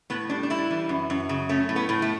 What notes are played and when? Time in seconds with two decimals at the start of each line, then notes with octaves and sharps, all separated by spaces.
0.10 A2 B3
0.30 G3 D4
0.43 D4
0.50 G3 E4
0.70 E3
0.89 F#2
1.10 F#2
1.29 C#3
1.49 A3 C#4
1.69 A2
1.76 B3
1.89 A2
2.02 A3